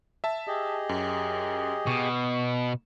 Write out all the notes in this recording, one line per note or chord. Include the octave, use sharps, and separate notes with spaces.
E5 A5
G4 G#4 D#5
F#2
B2 C#6